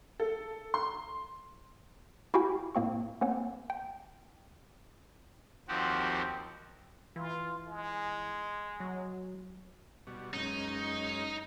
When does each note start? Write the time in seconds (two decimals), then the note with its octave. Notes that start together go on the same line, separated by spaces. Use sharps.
0.20 A4
0.74 C6
2.34 E4 F#4 G4 F5 G5 G#5
2.75 A2 A#3 C4 C#6
3.21 A#3 C4 C#5 F#5 G#5
3.70 G5
5.68 D#2 F3 C4 F#4 G4
7.16 E3 F4
7.66 G#3
8.80 F#3
10.07 B2 G3 F#4
10.33 F#2 G#3 C#4 D#4